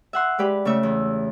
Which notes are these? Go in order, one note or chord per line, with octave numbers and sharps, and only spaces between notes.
E5 F#5 C6
G#3 G4 B4 D5
C#3 A3 E5 E6
E2